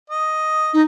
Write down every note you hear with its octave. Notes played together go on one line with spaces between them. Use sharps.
D#5
D#4